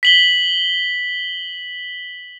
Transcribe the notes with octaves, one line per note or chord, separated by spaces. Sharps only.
B6 F#7 G7